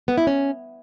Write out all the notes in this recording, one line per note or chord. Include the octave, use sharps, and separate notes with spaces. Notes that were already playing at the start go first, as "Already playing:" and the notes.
B3
E4
C#4